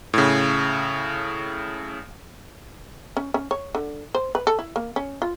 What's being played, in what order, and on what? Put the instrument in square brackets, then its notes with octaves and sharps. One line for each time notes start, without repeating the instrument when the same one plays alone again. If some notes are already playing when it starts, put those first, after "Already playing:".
[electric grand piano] A2 C#3
[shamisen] C#4
C#4
C#5
D3
C5
B4
A4
E4
A#3
C#4
F4